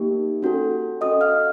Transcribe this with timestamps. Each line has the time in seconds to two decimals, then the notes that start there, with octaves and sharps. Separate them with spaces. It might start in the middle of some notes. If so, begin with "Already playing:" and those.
Already playing: A#3 D#4 G4
0.43 C#4 F#4 A4
1.01 C#4 F#4 A4 D#5 D#6
1.21 F5 F6